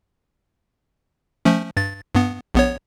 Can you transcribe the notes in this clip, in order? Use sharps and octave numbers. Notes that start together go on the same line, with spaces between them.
F3 A3 C#4
G2 A6
G2 B3
A#1 B3 C#5